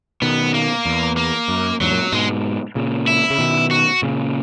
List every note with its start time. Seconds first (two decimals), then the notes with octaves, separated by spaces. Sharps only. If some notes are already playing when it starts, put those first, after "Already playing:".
0.22 B2 D#3 B3
0.54 A#3
0.86 E2
1.17 A#3
1.48 F#2
1.80 E2 G#2 F#3
1.91 F#2 A#2
2.12 G#2 B2 G#3
2.75 A#2 C#3
3.07 E4
3.30 C#3
3.39 B2 D#3
3.71 F#4
4.02 A#2 C#3